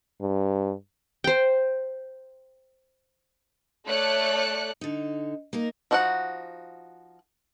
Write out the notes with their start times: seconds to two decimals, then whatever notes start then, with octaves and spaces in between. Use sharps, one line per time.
0.21 G2
1.24 C5 G5
3.87 A3 A4 C#5 D5 F#6 C#7
4.81 D3 D#4
5.53 A#3 D#4 A#4
5.91 F3 D#4 F#4 A4 F#5